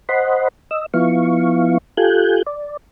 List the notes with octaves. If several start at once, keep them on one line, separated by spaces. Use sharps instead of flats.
C5 D#5 F#5 B5 C6
D#5 E6
F3 B3 E4 F5 C#6
F4 G4 A4 G#5 F#6 G6
D5